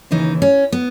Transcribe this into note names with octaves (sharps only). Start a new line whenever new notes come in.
D#2 C#3 E3 D#4
C#4
B3